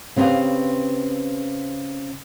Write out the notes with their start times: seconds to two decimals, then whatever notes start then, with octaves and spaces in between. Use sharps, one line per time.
0.16 C#3 C4 G4 B4 F5